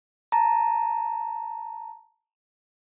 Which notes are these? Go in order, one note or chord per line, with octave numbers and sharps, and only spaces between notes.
A5 A#5